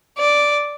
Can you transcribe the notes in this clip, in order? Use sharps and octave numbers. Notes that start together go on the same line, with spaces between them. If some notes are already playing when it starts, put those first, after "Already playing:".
D5